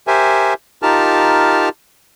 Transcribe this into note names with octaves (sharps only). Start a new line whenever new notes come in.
G4 A#4 C5 E5 G#5
D#4 F4 G4 A#4 A5 F6